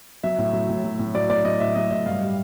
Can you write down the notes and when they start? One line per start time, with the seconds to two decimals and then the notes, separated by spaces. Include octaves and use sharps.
0.23 F#3 E5
0.38 A2
0.53 F#3
0.69 A2
0.84 F#3
0.99 A2
1.14 F#3 D5
1.29 A2 D5
1.45 F#3 D#5
1.60 A2 E5
1.75 F#3 D#5
1.91 A2 D#5
2.06 G2 F5
2.21 G3